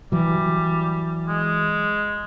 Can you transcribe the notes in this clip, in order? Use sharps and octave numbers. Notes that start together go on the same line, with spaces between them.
E3 F#3 G3
G#3